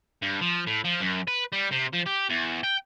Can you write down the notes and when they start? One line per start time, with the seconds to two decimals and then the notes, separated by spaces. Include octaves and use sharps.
0.22 G2
0.41 F3
0.67 A2
0.84 F3
1.00 F#2
1.28 B4
1.52 G3
1.72 C3
1.94 F3
2.07 G4
2.30 E2
2.63 G5